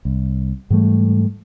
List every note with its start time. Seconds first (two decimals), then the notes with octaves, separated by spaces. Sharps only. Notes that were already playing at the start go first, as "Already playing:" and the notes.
0.05 C2
0.70 G#2 E3 G3 A3